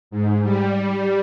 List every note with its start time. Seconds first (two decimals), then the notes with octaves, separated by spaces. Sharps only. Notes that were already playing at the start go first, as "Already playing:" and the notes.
0.11 G#2
0.43 G3